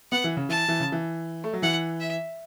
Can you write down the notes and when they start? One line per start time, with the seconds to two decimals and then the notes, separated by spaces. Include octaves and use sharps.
0.12 B3 F#5
0.24 E3
0.37 C#3
0.49 E3 A5
0.68 E3
0.80 C#3
0.92 E3
1.44 A3
1.53 F#3
1.62 E3 F#5
2.00 E5